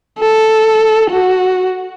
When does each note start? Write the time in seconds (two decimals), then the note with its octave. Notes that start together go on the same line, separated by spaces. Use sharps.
0.19 A4
1.10 F#4